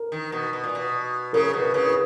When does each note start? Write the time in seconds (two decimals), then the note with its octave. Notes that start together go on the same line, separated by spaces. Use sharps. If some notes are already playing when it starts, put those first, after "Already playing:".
Already playing: A#4
0.12 D#3
0.32 B2
0.53 B2
0.64 A#2
0.75 B2
1.33 C#3 A#4
1.53 B2
1.60 B4
1.74 C#3
1.87 B4